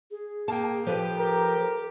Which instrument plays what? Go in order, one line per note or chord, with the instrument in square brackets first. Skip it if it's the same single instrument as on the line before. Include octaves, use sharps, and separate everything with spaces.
[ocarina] G#4
[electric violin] A#3 [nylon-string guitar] G5 A5
[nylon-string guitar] F3 B4 [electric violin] G4 [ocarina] A4
[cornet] A#4